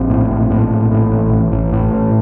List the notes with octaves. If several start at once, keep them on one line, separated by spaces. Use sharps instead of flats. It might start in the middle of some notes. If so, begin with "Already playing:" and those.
Already playing: A#1 C4
A2
A#1
A2
A#1
A2
A1
A1
A1
A2
A1